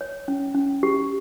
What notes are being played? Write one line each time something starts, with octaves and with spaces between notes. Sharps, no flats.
C#5
C#4
C#4
G4